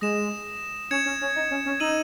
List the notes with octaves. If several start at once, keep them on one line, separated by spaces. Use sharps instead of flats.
G#3 D#6 A#6 E7
C#4 G#6 C#7 E7
C#4
C#4
D#4
C#4
C#4
D#4 E6 G#6 D#7 F#7